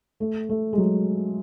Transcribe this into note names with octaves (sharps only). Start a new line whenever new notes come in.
A3
A3
G#3
F#3